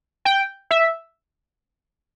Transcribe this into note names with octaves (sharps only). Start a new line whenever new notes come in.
G5
E5